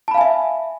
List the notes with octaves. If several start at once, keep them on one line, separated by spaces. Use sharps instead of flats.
E5 F5 G#5 A5 B5